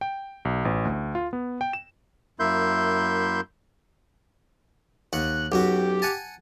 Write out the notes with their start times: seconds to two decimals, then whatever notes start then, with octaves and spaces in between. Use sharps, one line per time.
0.01 G5
0.45 B1
0.65 A1
0.85 D2
1.15 F4
1.33 B3
1.61 G5
1.73 E7
2.40 F#2 A#3 E4 E5 C6 G6
5.13 D#2 F#5 F#6
5.52 B1 F#2 F#4 G4
6.02 F#5 G#5 A5